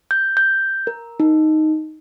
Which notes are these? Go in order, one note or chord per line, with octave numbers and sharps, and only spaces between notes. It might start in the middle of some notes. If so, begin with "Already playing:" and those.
G6
G6
A#4
D#4